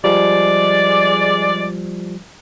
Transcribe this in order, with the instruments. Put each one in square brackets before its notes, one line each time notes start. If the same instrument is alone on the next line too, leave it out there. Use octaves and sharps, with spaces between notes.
[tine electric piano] F3 G3 [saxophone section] G#3 D5